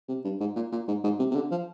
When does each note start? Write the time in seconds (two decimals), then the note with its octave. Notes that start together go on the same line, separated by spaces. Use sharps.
0.08 C3
0.24 G2
0.40 G#2
0.56 A#2
0.72 A#2
0.88 G#2
1.04 G#2
1.19 C3
1.31 C3
1.35 D3
1.51 F3